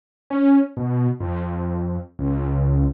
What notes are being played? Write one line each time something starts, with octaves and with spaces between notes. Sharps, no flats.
C#4
B2
F2
C#2